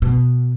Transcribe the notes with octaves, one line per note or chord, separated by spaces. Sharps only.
B2